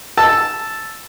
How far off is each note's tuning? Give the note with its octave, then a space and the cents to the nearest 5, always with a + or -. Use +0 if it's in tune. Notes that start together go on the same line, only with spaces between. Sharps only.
A5 +0 E6 +0